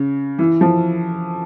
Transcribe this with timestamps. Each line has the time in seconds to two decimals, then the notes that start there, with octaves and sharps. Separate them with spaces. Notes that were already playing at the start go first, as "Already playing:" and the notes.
Already playing: C#3
0.39 E3
0.61 F3